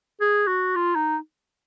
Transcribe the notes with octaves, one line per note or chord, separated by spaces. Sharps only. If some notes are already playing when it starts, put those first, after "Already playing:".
G#4
F#4
F4
D#4